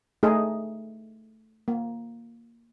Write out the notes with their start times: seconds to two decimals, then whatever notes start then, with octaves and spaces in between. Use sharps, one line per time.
0.23 A3 D#4 G#4
1.68 A#3